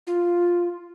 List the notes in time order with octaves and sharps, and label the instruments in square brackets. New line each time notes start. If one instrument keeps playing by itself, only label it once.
[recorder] F4